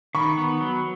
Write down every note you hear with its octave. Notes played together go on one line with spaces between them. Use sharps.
D#3 B5 C#6
B3
F#3